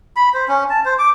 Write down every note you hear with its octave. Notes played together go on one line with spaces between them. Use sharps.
B5
C5
C#4
A5
C5
D6